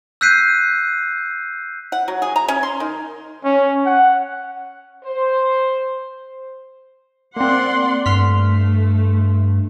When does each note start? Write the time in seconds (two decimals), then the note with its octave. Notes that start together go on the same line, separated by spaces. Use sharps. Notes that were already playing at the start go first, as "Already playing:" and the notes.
0.21 E6 F#6 G6 B6 C7 D#7
1.92 F#5
2.08 F#3
2.22 G#4
2.36 A#5
2.48 C#4
2.63 C6
2.80 D#3
3.44 C#4
3.86 F#5
5.04 C5
7.36 A#3 C4 D5 F#5 C6
8.06 G2 A3 C6 F6 B6